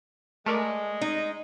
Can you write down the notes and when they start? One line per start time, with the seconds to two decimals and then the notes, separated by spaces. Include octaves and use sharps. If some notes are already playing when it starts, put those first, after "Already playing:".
0.46 G#3 A3 A#4 D5
1.01 D#4